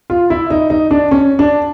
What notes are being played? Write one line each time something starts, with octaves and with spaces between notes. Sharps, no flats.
F4
E4
D#4
D#4
D4
C#4
D4